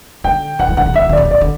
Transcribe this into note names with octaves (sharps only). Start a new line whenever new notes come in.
D3 G5
D3 F#5
E3
D3 F#5
C3
D3 E5
C3
D3
C3 D5
D3
C3 D5
D3